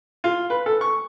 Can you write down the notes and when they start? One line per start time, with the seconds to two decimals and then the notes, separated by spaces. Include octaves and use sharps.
0.24 F4
0.50 B4
0.66 A4
0.81 C#6